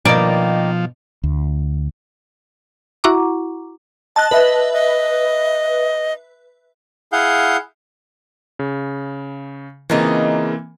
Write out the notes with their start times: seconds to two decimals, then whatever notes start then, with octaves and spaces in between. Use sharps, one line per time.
0.05 B2 D#3 F3 A#3 D5
1.24 D2
3.04 E4 F#4 F#5 A#5 C#6 D6
4.16 D#5 A5 F#6
4.31 B4 D#5 E5
4.73 D#5
7.13 E4 G#4 F5 F#5 G6
8.59 C#3
9.90 C#3 E3 A#3 C4 D#4 F4